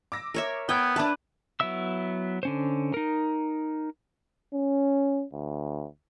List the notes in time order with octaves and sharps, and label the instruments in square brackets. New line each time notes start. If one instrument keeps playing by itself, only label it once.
[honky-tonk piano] D6 E6 A#6
[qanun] A#4 C#5 E5
[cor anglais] B3 [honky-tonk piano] B4 E6 G#6 [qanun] G5
[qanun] D4 B4 [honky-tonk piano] E5 A5 D6
[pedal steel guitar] F#3 B3 E4 E5 E6
D3 C#4 C5
D#4 A#4
[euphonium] C#4
D2